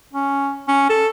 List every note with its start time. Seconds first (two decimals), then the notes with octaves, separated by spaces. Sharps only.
0.13 C#4
0.68 C#4
0.89 A4